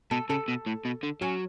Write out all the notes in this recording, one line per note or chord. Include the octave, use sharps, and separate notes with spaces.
B2 A4
C#3 A4
B2
A2
B2
D3
F#3 C#4